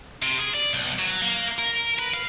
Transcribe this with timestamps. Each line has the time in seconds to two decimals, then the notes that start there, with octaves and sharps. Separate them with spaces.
0.22 C3
0.38 G#4
0.54 D5
0.73 B1
0.99 F#3
1.22 A#3
1.58 A#4
1.99 B4
2.14 F5